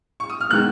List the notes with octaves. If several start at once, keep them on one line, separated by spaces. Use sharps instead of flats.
C#6
D#6
F6
D#3 G#3 B3 F#6